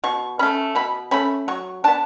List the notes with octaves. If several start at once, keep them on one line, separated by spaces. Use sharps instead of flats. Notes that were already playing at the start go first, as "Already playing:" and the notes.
B2 C#6
A3 C#4 B5
B2 B5
A3 C#4 B5
F#3 C#6
B3 D4 A5